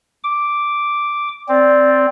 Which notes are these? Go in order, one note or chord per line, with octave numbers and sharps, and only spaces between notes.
D6
C4 D5